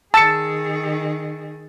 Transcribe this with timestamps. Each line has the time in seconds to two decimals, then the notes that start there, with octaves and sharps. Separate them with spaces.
0.14 D#3 G#4 A5 E6 A6 C#7